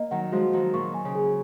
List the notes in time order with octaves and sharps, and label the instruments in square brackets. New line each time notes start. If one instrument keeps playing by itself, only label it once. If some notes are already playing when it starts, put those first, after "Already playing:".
Already playing: [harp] A#3 [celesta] D#5
[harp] D#3 F#3 [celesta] F#5
[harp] F3 G#3 [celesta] F#4
[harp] D#3 F#3 [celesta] F#4
[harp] A#2 [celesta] C#6
[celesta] G#5
[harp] C#3
[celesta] G#4